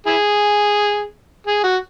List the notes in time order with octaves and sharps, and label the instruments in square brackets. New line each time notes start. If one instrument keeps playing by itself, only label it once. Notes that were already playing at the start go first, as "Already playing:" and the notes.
[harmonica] E4 G#4
G#4
F#4